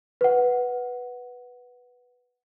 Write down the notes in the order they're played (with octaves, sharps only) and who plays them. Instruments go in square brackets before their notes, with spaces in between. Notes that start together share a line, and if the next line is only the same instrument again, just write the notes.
[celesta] B4 F#5